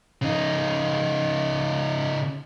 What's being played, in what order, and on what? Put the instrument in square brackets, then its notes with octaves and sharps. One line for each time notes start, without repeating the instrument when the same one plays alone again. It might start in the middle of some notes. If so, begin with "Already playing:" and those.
[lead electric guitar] C#3 D#4